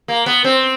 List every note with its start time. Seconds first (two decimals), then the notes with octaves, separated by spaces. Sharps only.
0.08 A#3
0.26 B3
0.44 C4